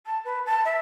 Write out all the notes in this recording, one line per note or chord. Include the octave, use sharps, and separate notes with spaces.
A5
B4
A5
E5